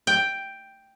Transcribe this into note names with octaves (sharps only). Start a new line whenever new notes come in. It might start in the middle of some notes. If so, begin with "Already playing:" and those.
G5